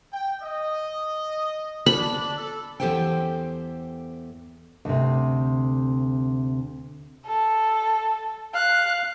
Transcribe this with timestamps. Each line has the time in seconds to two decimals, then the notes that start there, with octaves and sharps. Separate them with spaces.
0.13 G5
0.42 D#5
1.86 D4 B5
2.37 A4
2.80 E2 F#3 G4 A4 C5 G5
4.85 D2 C3
7.26 A4
8.54 F5 F#6